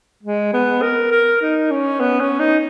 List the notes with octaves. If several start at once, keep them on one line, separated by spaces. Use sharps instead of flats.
G#3
B3
A#4
A#4
D#4
C#4
B3
C#4
D#4